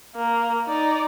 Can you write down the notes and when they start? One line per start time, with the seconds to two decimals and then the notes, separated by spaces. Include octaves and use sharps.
0.16 A#3
0.66 D#4 D5